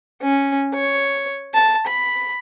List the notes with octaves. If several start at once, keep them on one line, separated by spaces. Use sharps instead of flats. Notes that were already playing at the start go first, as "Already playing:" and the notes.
C#4
C#5
A5
B5